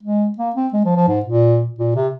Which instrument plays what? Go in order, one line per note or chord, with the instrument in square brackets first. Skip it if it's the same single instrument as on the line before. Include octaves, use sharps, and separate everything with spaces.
[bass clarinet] G#3
A#3
C4
G#3
F3
F3
G#2
A#2
A#2
C3